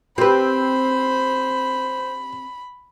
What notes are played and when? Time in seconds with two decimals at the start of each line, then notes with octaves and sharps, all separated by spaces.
0.18 C4 G4 B4 C5 B5